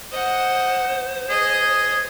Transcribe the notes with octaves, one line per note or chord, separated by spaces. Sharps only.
C5 D#5 F#5
G#4 D#5